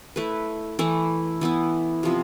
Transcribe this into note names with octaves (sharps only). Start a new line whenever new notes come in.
A3 E4 B4
E3 A3 E4
E3 B3 E4
C3 F3 B3